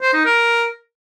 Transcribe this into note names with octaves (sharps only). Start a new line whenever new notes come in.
C5
D#4
A#4